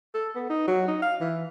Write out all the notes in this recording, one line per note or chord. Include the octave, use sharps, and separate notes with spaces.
A4
B3
D#4
F#3
D#4
F5
E3